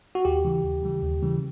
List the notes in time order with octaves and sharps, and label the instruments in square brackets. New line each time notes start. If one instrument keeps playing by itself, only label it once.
[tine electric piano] F#4
D#2 G4
C#3 E3 G3
D#2
C#3 E3 G3
D#2
C#3 E3 G3